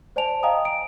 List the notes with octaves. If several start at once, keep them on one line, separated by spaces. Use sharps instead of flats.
C5 D5 G#5 A5 D7 F7
D#5 F5 G5 G#5 A#5 D#6
D7